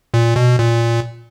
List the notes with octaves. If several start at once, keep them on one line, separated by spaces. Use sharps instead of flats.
A#2
B2
A#2